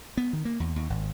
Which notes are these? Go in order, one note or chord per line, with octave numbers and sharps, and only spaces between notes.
B3
D#3
A#3
E2
D#2
G#1